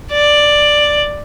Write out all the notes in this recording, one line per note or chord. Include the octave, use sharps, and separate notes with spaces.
D5